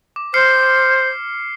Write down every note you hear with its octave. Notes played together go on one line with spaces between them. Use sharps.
D6
C5 F6 C7 C#7